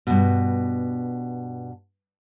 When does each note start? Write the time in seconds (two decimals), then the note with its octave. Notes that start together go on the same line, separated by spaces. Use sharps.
0.07 G2 B2